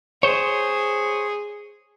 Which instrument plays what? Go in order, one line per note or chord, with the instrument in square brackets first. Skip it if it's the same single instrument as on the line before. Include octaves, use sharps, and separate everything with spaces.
[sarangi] G#4 [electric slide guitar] C5 C#5